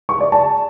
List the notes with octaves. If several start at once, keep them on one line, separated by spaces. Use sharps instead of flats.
C#6
D5
A5